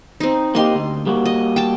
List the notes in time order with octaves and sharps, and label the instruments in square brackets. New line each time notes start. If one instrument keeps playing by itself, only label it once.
[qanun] C4 D#4
[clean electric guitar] A#3 D#4 G4 [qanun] D#5 C6
[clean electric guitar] D2
G3 A#3 F#4
[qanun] D#5
G5 A5